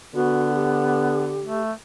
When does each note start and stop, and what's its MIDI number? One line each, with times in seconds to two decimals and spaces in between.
0.15 1.54 50
0.15 1.34 59
0.15 0.52 66
0.55 1.62 67
1.43 1.72 57